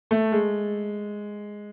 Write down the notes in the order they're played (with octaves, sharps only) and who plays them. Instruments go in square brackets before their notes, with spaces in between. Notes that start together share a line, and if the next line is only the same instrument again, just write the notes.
[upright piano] A3
G#3